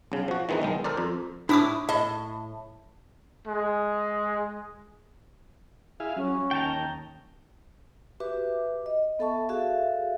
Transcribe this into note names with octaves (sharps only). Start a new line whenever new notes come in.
B1 C#3
F3 F#4
D#3 E3 G#3 B3 D#4
B1 D#3 G#3
A4 A#4 C5 D5
F2
A2 D4 E4 D6 D#6
A2 D#5
G#3
E4 G#4 F5
F#3 C#4
D#2 G5 A5 A#5
F#4 G4 B4 E5 D6
D#5
B3 A4 E5 A5 C#6
F#4 G#4 A4 E5 F5